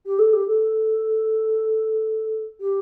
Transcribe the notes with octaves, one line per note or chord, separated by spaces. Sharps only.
G4
A4
G4
A4
G4